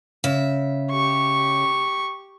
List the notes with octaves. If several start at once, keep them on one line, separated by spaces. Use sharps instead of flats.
C#3 E5
G4 C#6